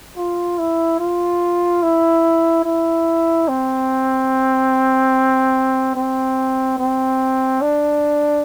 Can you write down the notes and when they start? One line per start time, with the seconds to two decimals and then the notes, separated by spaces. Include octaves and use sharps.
0.17 F4
0.58 E4
0.99 F4
1.83 E4
2.65 E4
3.49 C4
5.96 C4
6.79 C4
7.62 D4